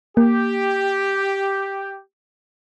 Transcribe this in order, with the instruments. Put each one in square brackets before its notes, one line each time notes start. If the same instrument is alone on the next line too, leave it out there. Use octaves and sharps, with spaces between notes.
[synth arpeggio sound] A#3 [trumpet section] G4